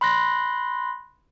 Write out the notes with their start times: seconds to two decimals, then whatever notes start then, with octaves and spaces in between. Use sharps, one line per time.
0.01 B5 C6 F#6 A#6